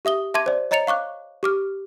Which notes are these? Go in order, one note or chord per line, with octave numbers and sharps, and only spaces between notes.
G4 E5 D#6 G7
E5 A5 C6 D6 G#6 D#7
C5 D5
C#5 D#5 A#5 A6 C#7 F7
F5 C#6 D6 F#6
G4 D6 F6